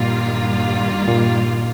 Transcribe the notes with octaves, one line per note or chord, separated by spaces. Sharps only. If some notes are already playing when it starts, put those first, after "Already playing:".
Already playing: G2 A#2 D#3 G3 A#3 F4
A#2